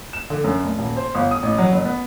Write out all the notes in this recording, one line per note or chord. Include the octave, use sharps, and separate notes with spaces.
E7
D3
F#2
F1
D#1
C5
G1
D#6
A1
F#3
F#1
B3